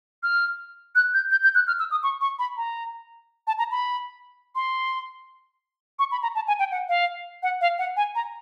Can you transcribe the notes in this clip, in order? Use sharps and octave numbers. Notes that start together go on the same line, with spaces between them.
F6
F#6
G6
G6
G6
F#6
F6
E6
D#6
C#6
C#6
B5
A#5
A5
A#5
B5
C6
C#6
B5
A#5
A5
G#5
G5
F#5
F5
F#5
F5
F#5
G#5
A#5